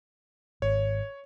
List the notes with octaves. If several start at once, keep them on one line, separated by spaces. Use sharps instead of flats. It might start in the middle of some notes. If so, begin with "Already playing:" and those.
G#1 C#5